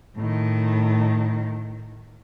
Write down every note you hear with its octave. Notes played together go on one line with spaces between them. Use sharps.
A2 D#3